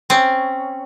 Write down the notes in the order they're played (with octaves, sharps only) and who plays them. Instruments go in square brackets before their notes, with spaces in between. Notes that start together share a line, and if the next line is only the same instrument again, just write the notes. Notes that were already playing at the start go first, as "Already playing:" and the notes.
[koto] C4 C#4